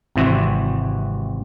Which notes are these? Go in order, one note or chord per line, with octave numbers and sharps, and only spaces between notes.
G#1 C3 E3 C4 F#4 E5